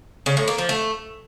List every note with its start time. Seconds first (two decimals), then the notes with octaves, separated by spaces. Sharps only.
0.26 C#3
0.37 A2
0.48 A#3
0.58 F3
0.69 A3